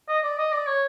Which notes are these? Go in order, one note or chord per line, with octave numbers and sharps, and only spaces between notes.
D#5
D5
D#5
D5
C#5